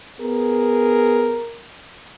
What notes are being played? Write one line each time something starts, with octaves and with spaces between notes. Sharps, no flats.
B3 G#4 A#4